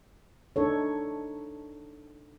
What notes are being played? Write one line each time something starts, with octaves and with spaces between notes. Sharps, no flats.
D4 D#4 A4 C#5